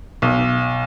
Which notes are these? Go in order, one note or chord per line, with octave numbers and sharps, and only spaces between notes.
B1